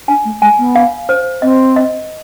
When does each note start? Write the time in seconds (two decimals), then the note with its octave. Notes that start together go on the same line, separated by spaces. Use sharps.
0.08 D4 G#5
0.25 A3
0.42 G#3 G#5
0.58 B3
0.75 F5
1.09 C5
1.42 C4 D#5
1.76 D#5